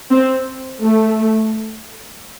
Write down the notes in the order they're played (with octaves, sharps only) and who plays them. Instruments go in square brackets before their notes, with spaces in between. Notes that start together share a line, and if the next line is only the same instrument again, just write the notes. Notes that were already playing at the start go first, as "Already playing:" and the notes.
[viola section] C4
A3